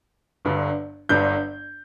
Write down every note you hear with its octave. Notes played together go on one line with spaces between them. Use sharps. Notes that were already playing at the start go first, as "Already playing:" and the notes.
G1 G2 D3
G1 G2 D3 G6